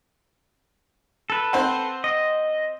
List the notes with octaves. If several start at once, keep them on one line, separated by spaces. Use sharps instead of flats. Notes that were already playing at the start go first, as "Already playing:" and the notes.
A4 B4
C4 C5 F#5
D#5